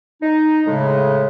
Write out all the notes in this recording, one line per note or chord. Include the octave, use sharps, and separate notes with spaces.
D#4
A2 C#3 G#3